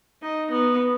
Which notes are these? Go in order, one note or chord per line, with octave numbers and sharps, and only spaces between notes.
D#4
B3